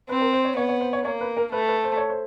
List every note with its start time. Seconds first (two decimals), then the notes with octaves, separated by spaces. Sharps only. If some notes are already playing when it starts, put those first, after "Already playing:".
0.09 C4 B4
0.21 A#4
0.33 C5
0.45 C#5
0.56 B3 C#5
0.69 C#5
0.81 C5
0.93 C#5
1.05 A#3 C#5
1.21 B4
1.37 A#4
1.52 A3 B4
1.68 B4
1.84 C5
1.97 C#5
2.10 C5